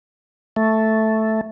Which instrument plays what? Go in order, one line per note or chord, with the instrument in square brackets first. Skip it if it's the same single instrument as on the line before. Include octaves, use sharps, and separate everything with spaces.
[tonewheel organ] A3